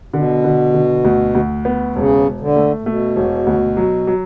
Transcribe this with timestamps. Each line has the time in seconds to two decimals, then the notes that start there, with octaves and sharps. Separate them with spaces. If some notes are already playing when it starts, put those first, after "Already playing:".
0.14 B2 D3
0.44 D3
0.74 D3
1.05 D2
1.35 D2
1.65 B3
1.96 E1 C#3
2.26 E1
2.40 D3
2.56 A3
2.81 A2
2.86 B2 A3
3.16 E1
3.47 D2
3.77 F#3
4.07 F#3